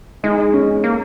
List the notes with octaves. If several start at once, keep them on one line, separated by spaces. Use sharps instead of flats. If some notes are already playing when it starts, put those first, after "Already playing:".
G#3 D#4
C#4
A#3